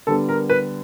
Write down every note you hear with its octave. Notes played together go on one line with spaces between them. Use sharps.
D3 G3 B3 A4
A#4
B4